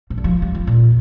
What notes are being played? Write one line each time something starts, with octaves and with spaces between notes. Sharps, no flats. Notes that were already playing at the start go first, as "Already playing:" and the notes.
C3
D3
F3
G3
F3
A#2